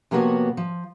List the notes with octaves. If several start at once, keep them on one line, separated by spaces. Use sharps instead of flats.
C3 F3 A#3 B3 F#4 C#5
F3